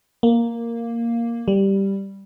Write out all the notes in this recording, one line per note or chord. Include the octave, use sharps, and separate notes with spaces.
A#3
G3